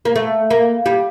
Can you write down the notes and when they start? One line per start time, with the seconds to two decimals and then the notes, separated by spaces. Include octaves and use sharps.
0.05 A#3
0.16 A3
0.51 A#3
0.86 G3